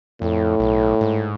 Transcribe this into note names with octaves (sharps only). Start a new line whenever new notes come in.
F2 A2
B1
G#2